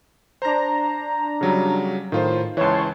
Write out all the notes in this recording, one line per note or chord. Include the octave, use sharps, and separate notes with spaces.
D4 C5 A#5 A#6
C#3 F#3 G3
A2 D#3 F4 C5
C#2 E3 C#5 A5 C6